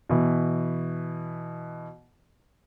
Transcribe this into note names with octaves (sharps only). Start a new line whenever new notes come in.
B2 E3